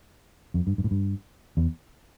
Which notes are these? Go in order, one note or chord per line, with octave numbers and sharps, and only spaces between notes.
F2
G2
G2
A2
G2
E2